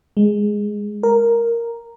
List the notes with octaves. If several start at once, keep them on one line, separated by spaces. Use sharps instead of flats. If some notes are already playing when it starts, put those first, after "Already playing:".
G#3
A#4